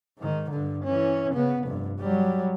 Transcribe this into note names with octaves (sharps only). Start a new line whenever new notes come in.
G#2 D#3
G2 D3
E3 C#4
C#3 B3
F1 G2
F#3 G3